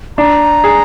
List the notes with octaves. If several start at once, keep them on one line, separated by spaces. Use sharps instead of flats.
D4 A#5
G#4